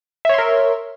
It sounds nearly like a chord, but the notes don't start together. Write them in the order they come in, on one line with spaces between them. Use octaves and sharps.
E5 C#5 C6 A#4